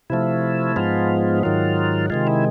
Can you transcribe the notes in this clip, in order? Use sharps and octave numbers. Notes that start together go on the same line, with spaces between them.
C3 F3 A3 E4
G#2 F3 G#3 B3 F4
G#2 D#3 F#3 F4
C3 D#3 G#3 F4
E4